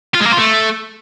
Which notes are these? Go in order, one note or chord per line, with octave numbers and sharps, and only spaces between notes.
F4
G#3
A#3
F4
A3